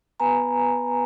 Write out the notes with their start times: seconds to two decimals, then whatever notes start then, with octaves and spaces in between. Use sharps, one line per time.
0.20 B3 B4 G#5 A#5